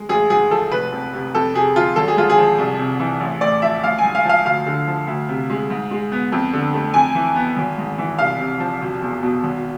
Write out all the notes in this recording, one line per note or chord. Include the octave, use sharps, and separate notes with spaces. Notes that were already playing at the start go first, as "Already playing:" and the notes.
Already playing: G#3
A1 G#4
G#2 G#4
F3 A4
F1 B4
F2
C3
F2 A4
C3 G#4
F3 F4
G#1 A4
G#4
G#2 F4
G#4
F3
C2
C3
E3
A1
A2 D5
F3 E5
A1 F5
G#5
G#2
F5
F3 F5
D2 F5
D3
F3
D2
C3
G#3
G#2
G#3
B3
F2
D3
A3
F2 G#5
E3
B3
G#1
G#2
E3
C2 F5
C3
F3
E1
E2
B2
G#1